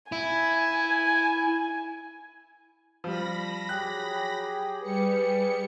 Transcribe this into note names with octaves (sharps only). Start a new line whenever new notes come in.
E4 G#5
F3 G3 B5 A#6
F#3 G4 G#4 F#6
G3 B4 C#7